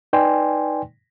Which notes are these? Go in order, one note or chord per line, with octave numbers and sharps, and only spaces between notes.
D#4 B4 D5 G5 G#5 C6